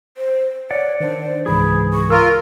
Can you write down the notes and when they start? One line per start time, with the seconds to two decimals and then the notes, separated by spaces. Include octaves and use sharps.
0.17 C5
0.71 C#5 D5 F#5
1.00 D#3 D4 C5
1.46 C#2 G#2 E3 G#4 B5
1.93 C#6
2.10 F4 A#4 E6